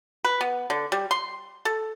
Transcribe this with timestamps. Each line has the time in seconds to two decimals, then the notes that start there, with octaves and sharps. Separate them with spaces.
0.25 B4
0.41 B3
0.70 D3
0.92 G3
1.11 C6
1.65 A4